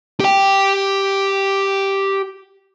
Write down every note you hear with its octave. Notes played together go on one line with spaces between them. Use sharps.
G4 G5